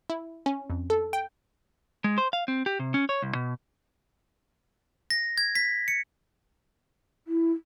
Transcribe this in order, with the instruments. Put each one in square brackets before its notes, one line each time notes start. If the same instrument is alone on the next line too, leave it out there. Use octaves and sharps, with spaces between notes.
[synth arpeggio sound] E4
C#4
F2
A4
G5
[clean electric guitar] G#3
C5
F5
C4
G4
C3
C#4
C#5
C2
B2
[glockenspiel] A#6
G#6
B6
C#7
[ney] E4